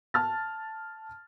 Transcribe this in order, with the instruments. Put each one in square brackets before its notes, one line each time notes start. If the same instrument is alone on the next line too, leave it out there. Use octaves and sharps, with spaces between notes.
[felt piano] A5 F6 A6